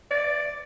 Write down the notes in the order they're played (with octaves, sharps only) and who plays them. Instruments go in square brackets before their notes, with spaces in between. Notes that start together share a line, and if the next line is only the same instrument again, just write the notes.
[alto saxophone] D5